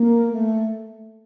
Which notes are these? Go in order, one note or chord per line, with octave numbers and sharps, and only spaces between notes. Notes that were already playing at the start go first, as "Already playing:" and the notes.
Already playing: A#3
A3